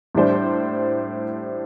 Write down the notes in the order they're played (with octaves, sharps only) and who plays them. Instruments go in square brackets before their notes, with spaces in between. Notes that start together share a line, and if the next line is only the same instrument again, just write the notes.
[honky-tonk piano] A2 G3 D4 C5